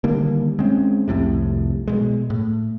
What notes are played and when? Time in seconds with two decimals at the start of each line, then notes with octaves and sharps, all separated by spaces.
0.04 D3 D#3 G3 A#3
0.59 G#3 C4 C#4
1.08 C2 F2 A2 C3
1.88 B2 G#3
2.30 A2